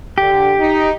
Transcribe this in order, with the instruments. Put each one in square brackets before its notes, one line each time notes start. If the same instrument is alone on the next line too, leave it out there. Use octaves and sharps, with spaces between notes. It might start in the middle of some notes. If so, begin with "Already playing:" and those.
[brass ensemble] D3 [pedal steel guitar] G4
[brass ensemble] D#4